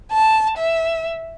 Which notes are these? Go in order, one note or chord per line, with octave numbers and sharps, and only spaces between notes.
A5
E5